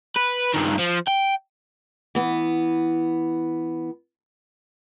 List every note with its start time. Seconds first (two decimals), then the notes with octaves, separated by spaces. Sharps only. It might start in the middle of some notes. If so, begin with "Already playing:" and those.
0.16 B4
0.54 G2 D#3
0.79 F3
1.07 G5
2.15 E3 B3